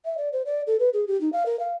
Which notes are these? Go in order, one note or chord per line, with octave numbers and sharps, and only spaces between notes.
E5
D5
C5
D5
A4
B4
G#4
G4
D#4
F5
A#4
F5